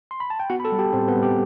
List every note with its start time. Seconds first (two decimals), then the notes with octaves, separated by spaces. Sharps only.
0.11 C6
0.20 B5
0.30 A5
0.40 G5
0.50 B3 F#4 F#5
0.60 B5
0.65 A4 A5
0.72 G3
0.79 G4 G5
0.93 A2 C4 C5
1.08 B3 B4
1.16 G3
1.23 G4